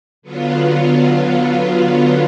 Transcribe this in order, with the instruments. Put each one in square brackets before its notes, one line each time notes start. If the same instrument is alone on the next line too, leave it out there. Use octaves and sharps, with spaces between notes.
[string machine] D3 F#3 B3 F4